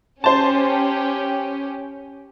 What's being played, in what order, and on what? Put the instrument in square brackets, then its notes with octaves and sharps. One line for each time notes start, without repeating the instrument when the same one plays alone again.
[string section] C#4 G4 [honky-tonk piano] C5 A5